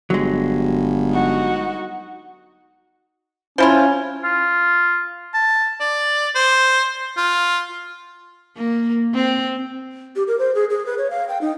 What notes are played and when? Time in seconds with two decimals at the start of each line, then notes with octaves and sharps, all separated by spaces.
0.10 G1 F#3 G#3
1.10 D#4 F#4
3.58 F3 C#4 E4 F4
4.24 F4
5.34 A5
5.81 D5
6.35 C5
7.17 F4
8.57 A#3
9.15 C4
10.16 G4
10.27 A#4
10.39 C5
10.55 G#4
10.70 G#4
10.86 B4
10.98 C#5
11.10 F5
11.29 G5
11.41 D#4